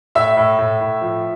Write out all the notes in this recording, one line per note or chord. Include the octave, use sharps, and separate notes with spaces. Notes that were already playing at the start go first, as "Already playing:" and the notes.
A2 E5 E6
A2
A2
A2
F3